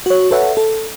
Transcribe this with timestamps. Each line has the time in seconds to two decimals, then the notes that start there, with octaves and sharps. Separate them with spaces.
0.06 F#4 C#5
0.31 A4 B4 C#5 E5 F#5
0.57 A4